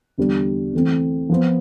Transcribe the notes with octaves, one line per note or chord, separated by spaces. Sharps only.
E2 D3 G3 D4
E3 A3 C4
F3 B3 F4 C5